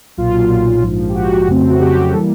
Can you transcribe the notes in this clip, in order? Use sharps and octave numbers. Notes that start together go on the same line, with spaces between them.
B1 A#2 F#3 F4
B1 A#2 F#3
A#1 G#2 F3
G4
A#1 G#2 F3 F#4
F2 C#3 F#3 A3 C4
F#4
F2 C#3 F#3 A3 C4 G4
E3 G3 A#3 A4